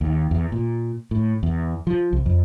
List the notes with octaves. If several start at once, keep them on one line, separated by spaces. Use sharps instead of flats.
D#2
E2
A#2
A2
E2
F3
C2
F2